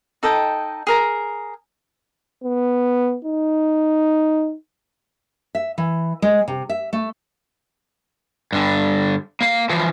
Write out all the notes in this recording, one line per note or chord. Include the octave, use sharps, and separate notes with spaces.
D#4 A4 D#5 G5
G#4 A#4 A#5
B3
D#4
E5
E3
G#3
C3
E5
A3
G2 D3
A#3 F5
E3 F3